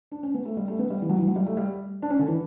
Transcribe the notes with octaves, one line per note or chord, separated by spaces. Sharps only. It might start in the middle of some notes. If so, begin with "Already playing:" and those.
D4
C#4
B3
A3
G3
A3
B3
G3
E3
F#3
E3
F#3
G3
A3
G3
D4
C#4
D3
E3